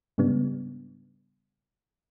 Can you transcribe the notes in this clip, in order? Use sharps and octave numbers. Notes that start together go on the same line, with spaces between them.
G#2 C#3 G3 B3 D4